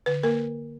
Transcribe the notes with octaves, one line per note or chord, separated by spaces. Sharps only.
D3 B4
A#3 A#4